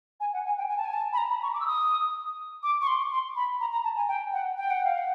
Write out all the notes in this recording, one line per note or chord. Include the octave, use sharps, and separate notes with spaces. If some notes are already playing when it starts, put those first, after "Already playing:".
G#5
F#5
G#5
G5
G#5
A5
G#5
A5
B5
A#5
B5
C#6
D6
E6
D#6
D6
C#6
C6
C6
B5
A#5
A#5
A5
G#5
G5
F#5
G5
F#5
F5
F#5